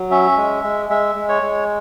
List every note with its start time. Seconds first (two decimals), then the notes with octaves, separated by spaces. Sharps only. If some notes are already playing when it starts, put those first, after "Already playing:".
Already playing: F#3
0.11 C#4 E5
0.37 G#3
0.64 G#3
0.90 G#3 E5
1.15 G#3
1.29 C#5
1.42 G#3